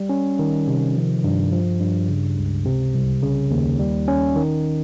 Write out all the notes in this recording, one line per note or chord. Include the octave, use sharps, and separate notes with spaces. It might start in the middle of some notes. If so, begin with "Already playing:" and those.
Already playing: G3
C#4
D#3
C3
F3
G2
F3
G2
C#3
C#2
C3
C2
C#3
D#2
G3
C#4
D#3